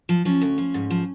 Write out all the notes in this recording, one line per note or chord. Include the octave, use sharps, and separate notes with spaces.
F3
F3 C#4
D2
F3
G#2
F3